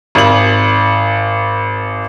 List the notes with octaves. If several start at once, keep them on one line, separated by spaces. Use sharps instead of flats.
G#1 F#7